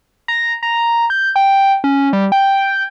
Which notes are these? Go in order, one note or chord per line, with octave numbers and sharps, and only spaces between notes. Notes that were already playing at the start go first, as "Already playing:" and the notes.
A#5
A#5
G6
G5
C#4
G3
G5